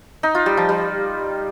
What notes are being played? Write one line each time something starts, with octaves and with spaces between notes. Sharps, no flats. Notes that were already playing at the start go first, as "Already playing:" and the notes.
D#4
F4
G3
F3
G3